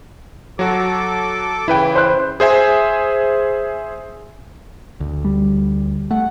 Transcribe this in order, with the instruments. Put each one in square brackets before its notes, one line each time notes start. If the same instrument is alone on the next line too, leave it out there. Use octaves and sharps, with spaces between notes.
[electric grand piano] F#3 F#4 [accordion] A4 D6
[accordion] C#3 E3 [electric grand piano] E4 B4 G5
[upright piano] C5 F#6
[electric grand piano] G#4 C5 E5 G#5
[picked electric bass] D2
[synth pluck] G3
[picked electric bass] A3 [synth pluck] F#5